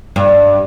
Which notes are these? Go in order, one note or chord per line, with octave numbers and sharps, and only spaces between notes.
G2